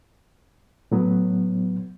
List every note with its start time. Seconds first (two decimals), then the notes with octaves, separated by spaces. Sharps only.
0.92 A2 F#3 B3